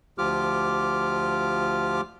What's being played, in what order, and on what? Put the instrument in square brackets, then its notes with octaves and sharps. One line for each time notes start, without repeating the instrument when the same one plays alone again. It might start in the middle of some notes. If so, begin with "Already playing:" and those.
[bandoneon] D2 F3 F4 G4 D6 F6